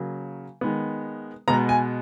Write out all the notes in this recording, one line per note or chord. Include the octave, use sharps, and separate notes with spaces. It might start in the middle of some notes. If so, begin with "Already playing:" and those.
Already playing: C#3 F#3 A#3
D#3 G#3 B3
B2 G#3 B3 A#5
G#5